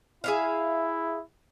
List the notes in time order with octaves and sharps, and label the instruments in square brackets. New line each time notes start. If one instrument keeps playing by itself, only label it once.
[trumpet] E4 [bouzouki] G#4 E5 F5